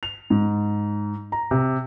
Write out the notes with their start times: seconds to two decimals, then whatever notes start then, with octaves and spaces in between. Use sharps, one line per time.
0.03 F7
0.30 G#2
1.32 A#5
1.51 C3